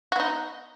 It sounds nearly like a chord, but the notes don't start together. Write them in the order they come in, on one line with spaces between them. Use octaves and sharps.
F#4 B3 D#4